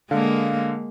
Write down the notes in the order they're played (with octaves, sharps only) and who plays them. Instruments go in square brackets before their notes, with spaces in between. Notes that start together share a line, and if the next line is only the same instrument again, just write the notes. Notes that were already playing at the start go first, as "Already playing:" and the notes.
[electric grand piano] D3 F5 [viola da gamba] G#3 A#3